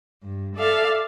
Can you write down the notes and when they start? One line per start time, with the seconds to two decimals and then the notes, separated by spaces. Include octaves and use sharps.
0.23 G2
0.55 A4 D5 E5 F5